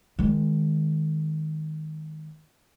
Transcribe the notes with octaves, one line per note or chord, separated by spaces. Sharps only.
D#3 G#3